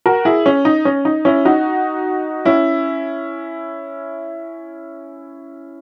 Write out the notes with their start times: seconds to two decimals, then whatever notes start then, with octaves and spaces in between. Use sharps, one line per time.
0.06 F#4 A#4
0.25 E4 G#4
0.46 C#4
0.65 D#4
0.85 C#4
1.05 D#4
1.25 C#4 E4
1.45 D#4 F#4
2.45 C#4 E4